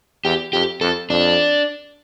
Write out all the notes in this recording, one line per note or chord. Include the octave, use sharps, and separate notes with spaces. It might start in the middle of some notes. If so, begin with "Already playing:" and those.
E2 G4
F2 G4
F2 A4
F2 D4